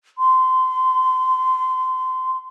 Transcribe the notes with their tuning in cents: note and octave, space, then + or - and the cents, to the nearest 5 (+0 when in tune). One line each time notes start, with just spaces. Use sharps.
C6 -25